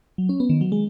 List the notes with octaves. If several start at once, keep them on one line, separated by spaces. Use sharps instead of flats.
F#3
C#4
B3
D#3
F#3
G#3